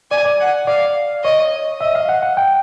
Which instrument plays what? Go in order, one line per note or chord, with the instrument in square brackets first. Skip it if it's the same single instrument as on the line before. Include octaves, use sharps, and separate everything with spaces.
[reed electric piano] D5 [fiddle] G#5
[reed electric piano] D5
[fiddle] F#5
[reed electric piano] D5 [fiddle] F5
[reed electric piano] C#5 [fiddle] D#5
[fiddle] D#5 [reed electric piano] E5
[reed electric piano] F5
F#5
F#5
G5